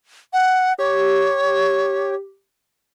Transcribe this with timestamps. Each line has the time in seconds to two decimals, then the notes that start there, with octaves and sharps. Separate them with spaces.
0.33 F#5
0.78 G4 C#5